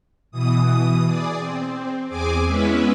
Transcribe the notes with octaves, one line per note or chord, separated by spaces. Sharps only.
B2 E3 D#6
G#4 D5
C4
E2 C4 G#4 G#5 D6
G#3 B3 C#4 E4 B4 E5